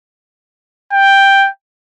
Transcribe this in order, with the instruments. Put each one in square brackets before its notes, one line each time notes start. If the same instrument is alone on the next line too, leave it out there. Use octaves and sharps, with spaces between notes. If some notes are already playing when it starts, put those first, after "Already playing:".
[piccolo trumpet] G5